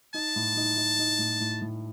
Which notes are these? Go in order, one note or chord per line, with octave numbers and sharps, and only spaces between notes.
D#4 A5
A2
D#4
D#4
D#4
A2
A2
A2